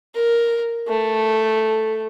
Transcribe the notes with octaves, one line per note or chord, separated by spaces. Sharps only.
A#4
A3